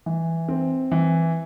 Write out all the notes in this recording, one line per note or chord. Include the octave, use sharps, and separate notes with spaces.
E3
C4
E3